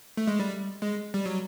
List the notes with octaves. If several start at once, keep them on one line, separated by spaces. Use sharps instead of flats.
A3
G#3
G3
G#3
G3
F#3